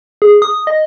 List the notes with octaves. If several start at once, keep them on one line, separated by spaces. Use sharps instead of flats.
G#4
D#6
D#5